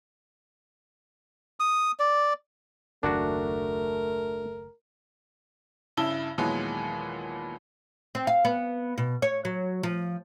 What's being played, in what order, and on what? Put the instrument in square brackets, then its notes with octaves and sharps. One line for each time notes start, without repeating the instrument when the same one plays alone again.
[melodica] D#6
D5
[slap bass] F#1 D#2 [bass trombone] A3 [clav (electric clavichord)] D4 F#4 [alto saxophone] A#4
[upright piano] G2 C#3 E4 A5 G7
D#2 A#2 E3 F#3 G#3 B3
[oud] C4
F5
B3
B2
C#5
F#3
F3